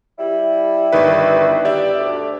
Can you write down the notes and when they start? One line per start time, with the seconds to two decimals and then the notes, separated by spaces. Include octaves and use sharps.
0.18 G3 E4
0.93 G1 D#3 B4
1.65 G4 D5 E5
1.96 D2